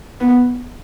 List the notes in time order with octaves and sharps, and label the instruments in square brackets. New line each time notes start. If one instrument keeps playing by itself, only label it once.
[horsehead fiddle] B3